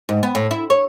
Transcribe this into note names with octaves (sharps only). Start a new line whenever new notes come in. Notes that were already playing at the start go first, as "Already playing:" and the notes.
G#2
B3
A2
E4
C#5